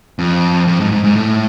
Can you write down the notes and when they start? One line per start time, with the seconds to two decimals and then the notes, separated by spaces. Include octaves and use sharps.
0.19 F2
0.68 F2
0.80 G#2
0.92 G#2
1.04 G#2
1.16 A2